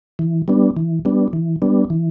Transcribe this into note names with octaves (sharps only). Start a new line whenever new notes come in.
E3
G3 B3 D4
E3
G3 B3 D4
E3
G3 B3 D4
E3